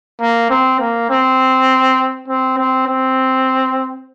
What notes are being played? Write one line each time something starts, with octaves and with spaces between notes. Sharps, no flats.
A#3
C4
A#3
C4
C4
C4
C4